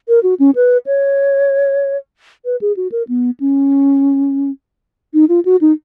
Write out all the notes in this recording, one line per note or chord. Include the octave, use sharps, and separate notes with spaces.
A#4
F#4
C#4
B4
C#5
B4
G#4
F#4
A#4
B3
C#4
D#4
F4
F#4
D#4